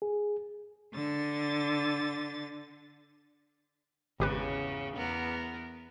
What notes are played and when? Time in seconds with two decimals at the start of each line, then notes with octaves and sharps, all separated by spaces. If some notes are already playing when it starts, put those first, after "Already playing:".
0.02 G#4
0.95 D3 A6
4.20 G#1 E2 C#3 G4 B4
4.96 E2 B3 A#4